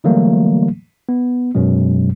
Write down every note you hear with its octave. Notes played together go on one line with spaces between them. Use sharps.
D3 E3 F#3 G3 A3 A#3
B3
F#2 B2 F#3 G#3